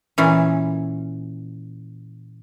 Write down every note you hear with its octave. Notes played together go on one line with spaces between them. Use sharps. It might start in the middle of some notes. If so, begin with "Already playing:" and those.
A#2 E3 C#4